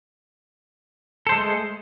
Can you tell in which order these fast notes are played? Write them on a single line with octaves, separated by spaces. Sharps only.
A4 C5 G#3 A3